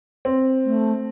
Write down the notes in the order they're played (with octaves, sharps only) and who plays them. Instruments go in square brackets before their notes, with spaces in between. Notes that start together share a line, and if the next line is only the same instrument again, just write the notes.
[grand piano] C4
[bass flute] A3